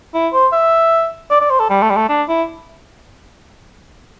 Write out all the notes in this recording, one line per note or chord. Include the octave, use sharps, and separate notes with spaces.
E4
C5
E5
D5
D5
C5
A4
G3
A3
G3
A3
D4
E4